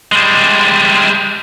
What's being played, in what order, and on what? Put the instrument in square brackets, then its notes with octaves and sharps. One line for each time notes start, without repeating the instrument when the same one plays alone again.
[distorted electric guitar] G3 G#3